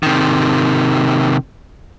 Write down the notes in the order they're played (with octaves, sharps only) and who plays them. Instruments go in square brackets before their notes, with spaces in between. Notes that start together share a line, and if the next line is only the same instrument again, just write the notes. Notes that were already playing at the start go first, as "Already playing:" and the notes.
[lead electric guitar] C3 D#3